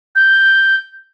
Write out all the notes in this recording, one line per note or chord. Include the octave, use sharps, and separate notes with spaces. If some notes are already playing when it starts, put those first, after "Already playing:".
G6